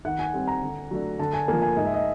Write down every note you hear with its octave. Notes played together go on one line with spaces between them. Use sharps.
D#3 F#5
G#5
G3 C4
A#5
D3
F#3 A3 D4
D3 A5
G#5
F3 A#3 G#5
G#5
G#2 D#5
E5
D#5